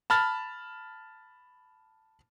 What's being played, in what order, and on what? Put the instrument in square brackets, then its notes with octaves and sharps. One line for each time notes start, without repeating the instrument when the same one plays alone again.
[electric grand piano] A5 B5 F6 A6